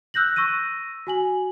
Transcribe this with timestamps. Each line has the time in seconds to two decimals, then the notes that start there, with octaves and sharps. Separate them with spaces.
0.14 E6 F#6 G6 A#6 F#7
0.36 C#6 E6 A#6 D#7
1.07 F#4 G#5 F#7